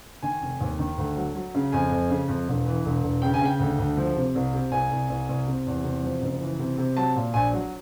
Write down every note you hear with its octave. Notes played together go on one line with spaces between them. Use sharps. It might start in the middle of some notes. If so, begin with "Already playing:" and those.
D#3 G#5
F1
D#2
D#3
D2
F#3
F#3
C#3
F2 G#5
F2
C#3
F2
E1
E3
E1
E1
C#3 G5
G#5
C#3 G5
D2
D2
F3
C3
C2
C3
C2 G#5
C2
C2
C2
C3
E2
C3
F3
F#1
E3
C3
C3
F#3 A5
A#2
A#1 G#5
F#3